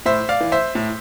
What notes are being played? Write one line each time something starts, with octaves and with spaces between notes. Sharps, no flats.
A2 C5 E5
D5 F5
E3
C5 E5
A2